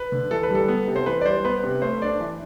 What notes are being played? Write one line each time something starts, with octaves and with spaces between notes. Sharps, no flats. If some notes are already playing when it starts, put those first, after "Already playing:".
Already playing: B4
D3
E3 A4
B4
G3 A4
B3
C3
C5
E3 B4
D5
G3 C5
B3 B4
C3
A3 C5
D4 D5
E3